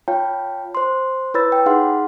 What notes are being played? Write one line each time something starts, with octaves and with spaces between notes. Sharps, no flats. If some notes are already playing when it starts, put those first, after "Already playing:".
F4 C#5 F5 G5 A5
C5 C6
E4 B4 C#5 B5 E6 A6
G5
D#4 G#4 F5 F#5 C6